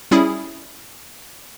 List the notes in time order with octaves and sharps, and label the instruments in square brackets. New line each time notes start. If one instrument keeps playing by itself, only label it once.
[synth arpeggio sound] G3 C#4 E4 G#4